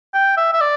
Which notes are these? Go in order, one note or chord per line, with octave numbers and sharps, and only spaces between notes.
G5
E5
E5
D5